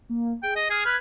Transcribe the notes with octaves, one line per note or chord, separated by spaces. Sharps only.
A#3
G#4 G5
D#5
G#4 F6 G#6
B4